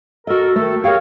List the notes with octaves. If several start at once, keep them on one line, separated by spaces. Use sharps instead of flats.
F#4 A4 A#4 D#5
D#3 A3 A4
G4 G#4 A#4 C#5 F5 G5